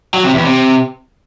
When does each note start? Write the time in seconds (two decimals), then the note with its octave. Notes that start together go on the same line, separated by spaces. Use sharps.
0.14 F#3
0.24 C3
0.34 E2
0.44 C3